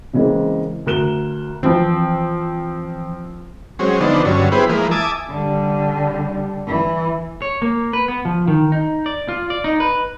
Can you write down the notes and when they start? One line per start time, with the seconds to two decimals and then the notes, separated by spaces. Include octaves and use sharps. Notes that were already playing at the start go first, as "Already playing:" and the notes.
0.13 C#3 E3 G#3 A#3 C4
0.86 D2 A#4 F#6 E7 G7
1.63 E3 F3 C4
3.79 F#3 G#3 C4 C#4
4.00 D3 F3 B3 C4 D4 D#4
4.25 G2 D3 F#3 C#4
4.52 B3 E4 G4 G#4 B4 C5
4.69 E3 F3 G#3 A#3
4.91 E5 G#5 A5 D6 D#6
5.30 D3 G3
6.67 E3
7.42 C#5
7.62 A#3
7.93 B4
8.08 B3
8.25 F3
8.48 D#3
8.72 D#4
9.06 D5
9.28 F4
9.50 D5
9.64 D#4
9.80 B4